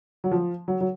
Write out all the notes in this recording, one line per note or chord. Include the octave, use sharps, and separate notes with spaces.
F#3
F3
F#3
F#3